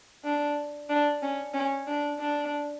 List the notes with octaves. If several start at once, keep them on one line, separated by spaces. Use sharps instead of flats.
D4
D4
C#4
C#4
D4
D4